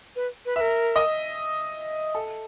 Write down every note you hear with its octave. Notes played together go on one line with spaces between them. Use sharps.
B4
B4
B4 E5
A#4
D#5
A4